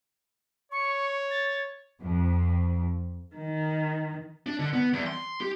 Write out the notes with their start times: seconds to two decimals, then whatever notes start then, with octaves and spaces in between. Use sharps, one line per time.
0.72 C#5 C#6
1.31 A6
2.00 F2
3.36 D#3
4.46 D4
4.59 D3
4.73 B3
4.93 E2
5.06 C6
5.41 G4